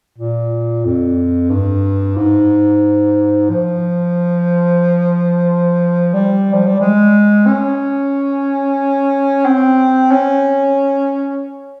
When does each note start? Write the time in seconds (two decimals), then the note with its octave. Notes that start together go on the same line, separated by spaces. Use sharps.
0.18 A#2
0.85 F2
1.50 G2
2.17 G#2
3.50 F3
6.13 G3
6.53 F3
6.67 G3
6.80 G#3
7.46 C#4
9.45 C4
10.11 C#4